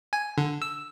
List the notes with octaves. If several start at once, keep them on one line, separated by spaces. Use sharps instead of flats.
G#5
D3
E6